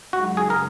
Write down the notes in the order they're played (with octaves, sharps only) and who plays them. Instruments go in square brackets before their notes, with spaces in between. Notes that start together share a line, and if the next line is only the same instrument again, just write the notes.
[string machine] F#2 C#3 G#3 D#4 [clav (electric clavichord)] F#4
[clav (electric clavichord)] G#4
A#4